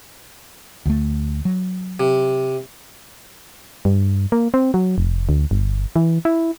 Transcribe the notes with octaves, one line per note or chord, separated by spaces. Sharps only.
D2 F#3 A3
F#3
C3
G2
A#3
C4
F#3
F1
D2
G1
E3
E4